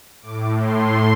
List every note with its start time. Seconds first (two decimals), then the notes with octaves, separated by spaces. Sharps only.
0.22 A2 D6
0.58 C6